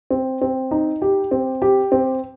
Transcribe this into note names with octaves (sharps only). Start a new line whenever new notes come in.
C4
C4
D#4
G4
C4
G4
C4